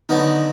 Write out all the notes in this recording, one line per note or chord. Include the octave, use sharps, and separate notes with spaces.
D3 D#3 F#3 B3 D#4